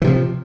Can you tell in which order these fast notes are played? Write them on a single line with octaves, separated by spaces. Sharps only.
E3 C3 F3